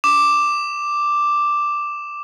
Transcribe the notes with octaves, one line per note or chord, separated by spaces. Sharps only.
D6 E7